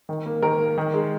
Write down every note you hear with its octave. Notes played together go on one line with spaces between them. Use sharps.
D#3
A#3
D#3 A#4
A#3
D#3
G#3